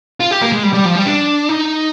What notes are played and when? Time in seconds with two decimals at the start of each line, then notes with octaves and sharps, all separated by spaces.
0.20 F4
0.31 G4
0.42 A#3
0.52 G#3
0.63 G3
0.74 G3
0.85 F3
0.96 G3
1.06 D4
1.49 D#4